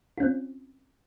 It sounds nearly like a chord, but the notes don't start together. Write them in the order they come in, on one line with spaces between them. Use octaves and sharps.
F4 C#4 C4